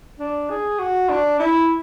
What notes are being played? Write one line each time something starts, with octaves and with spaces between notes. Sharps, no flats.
D4
G#4
F#4
D4
E4